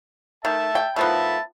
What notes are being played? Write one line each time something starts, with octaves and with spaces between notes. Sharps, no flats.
D#3 E5 A5
G5
D#3 F3 B3 E5 A5 B5